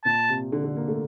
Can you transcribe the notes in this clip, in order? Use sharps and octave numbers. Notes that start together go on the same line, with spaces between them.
A#2 A5
C3
D3
D3
A#3
A3